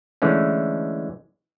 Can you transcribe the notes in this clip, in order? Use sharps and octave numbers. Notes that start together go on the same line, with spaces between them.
D3 E3 G#3 A3 C#4